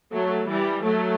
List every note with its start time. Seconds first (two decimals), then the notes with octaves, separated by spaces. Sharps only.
0.12 F#3 A3
0.48 E3 G3
0.84 F#3 A3